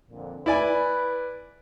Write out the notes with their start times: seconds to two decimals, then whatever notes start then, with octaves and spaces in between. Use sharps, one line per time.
0.10 F2 A#2 D3
0.46 E4 B4 D5 G#5